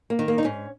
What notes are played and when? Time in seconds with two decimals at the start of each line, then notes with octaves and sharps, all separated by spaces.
0.10 A#3
0.19 D#3
0.28 A#3
0.38 D#4
0.44 G#2 C#4